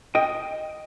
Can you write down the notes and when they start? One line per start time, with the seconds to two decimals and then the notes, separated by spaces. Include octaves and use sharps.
0.15 D#5 G5